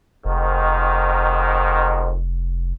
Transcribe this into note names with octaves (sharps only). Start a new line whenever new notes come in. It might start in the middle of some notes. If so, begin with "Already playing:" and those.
F1 F2 G#2 D#3